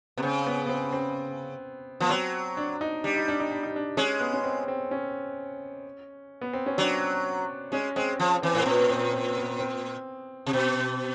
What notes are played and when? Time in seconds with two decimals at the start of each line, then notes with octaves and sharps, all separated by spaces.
0.17 C3 B3
0.22 C#3 C4
0.47 B3
0.66 B3
0.69 C4
0.93 C4
2.00 F3 B3
2.09 F#3 C4
2.57 D4
2.81 D#4
3.04 G3 D4
3.16 D#4
3.28 D4
3.40 D#4
3.51 D4
3.63 D#4
3.76 D4
3.97 G#3 C#4
4.20 B3
4.34 C#4
4.44 C4
4.68 C4
4.91 C#4
6.41 B3
6.53 C4
6.66 C#4
6.78 F#3 D4
7.72 G#3 C#4
7.96 G#3 C4
8.20 F3
8.42 E3 C4
8.55 A2
8.60 C4
8.66 A#2 C#4
8.89 C4
9.13 C4
9.37 B3
9.59 C4
10.46 C3
10.53 B2 C4